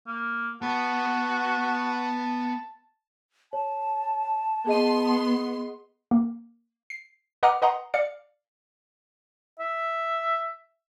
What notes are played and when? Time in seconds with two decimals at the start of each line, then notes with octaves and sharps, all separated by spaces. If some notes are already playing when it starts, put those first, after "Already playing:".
0.07 A#3
0.62 B3 F#4 B4 A5
3.53 C#5 A5
4.67 B3 G#4 D#5 C6 D#7
6.11 A#3
6.90 C7
7.43 B4 D#5 F#5 A#5 D6 F6
7.62 B4 D#5 F#5 A#5 C6
7.94 D5 F5 C#7
9.60 E5